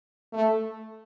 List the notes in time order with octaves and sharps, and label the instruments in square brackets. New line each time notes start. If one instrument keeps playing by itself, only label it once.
[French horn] A3